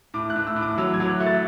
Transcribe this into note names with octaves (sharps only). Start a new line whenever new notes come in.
A2 D6
F#6
A2
E6
A2
D6
F#3 E6
G#6
F#3
F#6
A3
A6